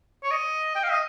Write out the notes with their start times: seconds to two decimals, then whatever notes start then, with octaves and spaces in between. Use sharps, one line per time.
0.23 C#5
0.31 D#5
0.75 G5
0.84 F5
0.91 D#5